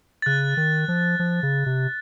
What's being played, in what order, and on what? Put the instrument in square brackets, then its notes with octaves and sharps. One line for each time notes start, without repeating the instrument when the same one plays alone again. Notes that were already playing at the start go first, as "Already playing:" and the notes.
[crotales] A6
[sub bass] C#3 [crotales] F#6
[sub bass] D#3
F3
F3
C#3
C3